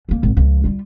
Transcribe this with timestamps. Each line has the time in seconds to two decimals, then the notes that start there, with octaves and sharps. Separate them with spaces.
0.09 C#2 A#3
0.23 G#1
0.37 C#2 F3
0.64 G3 F4